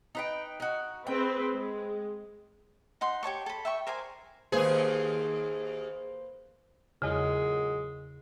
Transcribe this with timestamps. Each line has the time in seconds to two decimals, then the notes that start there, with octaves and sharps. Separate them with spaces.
0.15 D#4 B4 G5
0.60 D#4 F#4
1.07 C4 G#4 B4 G5
1.54 G#3
3.01 D#4 F#5 C6
3.23 G4 C#5 A5 C#6
3.46 A4 B5
3.65 E5 G5 C#6
3.87 A#4 C5 D5 G#5
4.52 D#2 A#3 G#4 B4 C5
7.02 E2 A#2 C#3 F#3 G#3